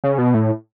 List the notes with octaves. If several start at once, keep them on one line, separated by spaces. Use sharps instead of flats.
C#3
B2
A2